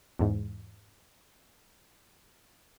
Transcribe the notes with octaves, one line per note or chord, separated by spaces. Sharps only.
E2 G#2